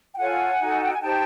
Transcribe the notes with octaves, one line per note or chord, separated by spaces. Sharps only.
G5
F4 A4 C#5 F#5 G#5
D#4 F#4 A4
G5
G#5
D#4 G4 C5 G5 A5